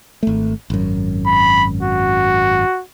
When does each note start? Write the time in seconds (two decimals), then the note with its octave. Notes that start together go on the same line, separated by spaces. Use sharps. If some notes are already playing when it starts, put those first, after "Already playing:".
0.23 G#1 A3
0.70 G#1 F#2
1.27 B5
1.83 F#4